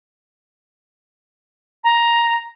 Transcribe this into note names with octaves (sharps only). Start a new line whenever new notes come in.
A#5